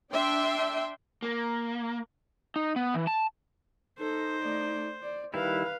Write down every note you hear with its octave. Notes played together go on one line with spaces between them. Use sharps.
D4 E5 G5 C6
A#3
D#4
B3
E3
A5
D#4 A4 C5
A3 D5
D5
D#3 G3 E4 B4 F5